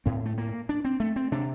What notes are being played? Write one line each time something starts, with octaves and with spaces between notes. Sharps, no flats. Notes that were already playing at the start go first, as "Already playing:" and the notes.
A2 C4
A3
A#3
D4
C4
A3
C4
C3 D4